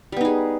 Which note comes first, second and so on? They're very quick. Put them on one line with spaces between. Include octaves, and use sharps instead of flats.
G3 B3 D#4 G#4